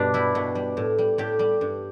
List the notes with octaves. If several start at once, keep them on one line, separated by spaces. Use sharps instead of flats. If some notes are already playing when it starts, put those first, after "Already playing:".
Already playing: G2 B2 B3 D4
G3 E4
B2
G3
A2
G3
A2 G4
G3
G2